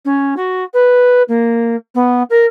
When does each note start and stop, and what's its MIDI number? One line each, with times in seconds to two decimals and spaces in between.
0.05 0.34 61
0.36 0.63 66
0.73 1.22 71
1.28 1.76 58
1.95 2.23 59
2.30 2.46 70